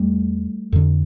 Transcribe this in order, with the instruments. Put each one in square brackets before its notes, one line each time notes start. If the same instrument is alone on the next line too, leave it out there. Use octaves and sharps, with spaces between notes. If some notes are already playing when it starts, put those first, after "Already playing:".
Already playing: [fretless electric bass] E2 G3 A3
F2 D3